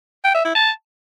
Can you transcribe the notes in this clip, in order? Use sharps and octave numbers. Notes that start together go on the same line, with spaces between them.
G5
E5
E4
A5